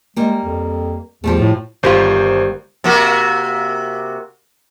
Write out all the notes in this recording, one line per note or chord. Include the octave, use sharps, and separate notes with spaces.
G3 G#3 A#3
F2
E2 F3 G3 A3
A2
G1 D#3 G3 F4 C5
C3 A#3 F#4